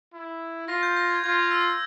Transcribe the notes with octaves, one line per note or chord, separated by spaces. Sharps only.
E4
F4 A#6
G6
A#6
G#6
F4 G#6
E6